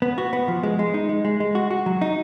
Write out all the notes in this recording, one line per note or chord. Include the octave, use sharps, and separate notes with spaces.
B3
F#4
B3
F3
G#3
G#3
D#4
G#3
G#3
G#3
F#4
F#4
F#3
D#4